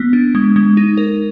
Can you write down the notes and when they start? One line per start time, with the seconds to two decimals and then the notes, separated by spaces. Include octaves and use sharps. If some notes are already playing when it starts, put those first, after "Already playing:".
Already playing: A#3 B3
0.13 D4
0.35 G#3
0.56 G#3
0.77 D#4
0.97 A#4